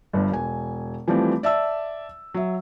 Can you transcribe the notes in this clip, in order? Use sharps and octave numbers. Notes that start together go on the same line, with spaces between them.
G1 G2
E1 G#5
E3 F3 G3 A3 C4
D5 E5 A5 E6
F#3 E5